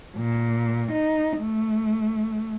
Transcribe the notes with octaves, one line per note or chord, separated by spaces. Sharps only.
A#2
D#4
A3